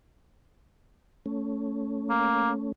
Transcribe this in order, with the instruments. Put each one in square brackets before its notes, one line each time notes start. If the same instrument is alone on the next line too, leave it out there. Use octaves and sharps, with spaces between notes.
[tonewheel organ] A3 C#4
[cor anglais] A#3